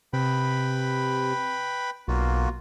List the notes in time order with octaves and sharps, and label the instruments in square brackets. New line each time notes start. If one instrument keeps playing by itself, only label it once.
[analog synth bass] C3 [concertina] B4 G5 B5
[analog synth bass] B1 [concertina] A#3 F4 F#4